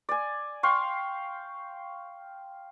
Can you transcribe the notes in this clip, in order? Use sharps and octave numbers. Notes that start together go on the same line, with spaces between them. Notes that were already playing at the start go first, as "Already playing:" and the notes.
D5 G#5
F5 G5 C6 C#6